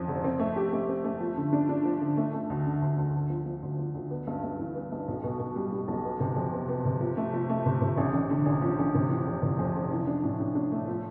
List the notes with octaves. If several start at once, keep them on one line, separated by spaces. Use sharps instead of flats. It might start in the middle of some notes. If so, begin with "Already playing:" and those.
Already playing: F2 E3
F1
C4
A3
G4
A3
C4
A3
F3
D3
D4
D4
F3
D3
A3
A3
D2
D3
D2
D2
D2
F3
F3
D2
F3
D2
B3
G2
G2
E3
B3
G2
B1
B2
B2
G3
G3
B1
B3
C3
F2
B3
B3
C3
F3
A3
F3
A3
C3
C3
A1
A1
D3
A1
F3
A1
C3
E3
F1
C3
F2
F1
E3
D4
A2
D4
D4
A3
F3